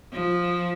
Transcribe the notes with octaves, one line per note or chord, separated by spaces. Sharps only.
F3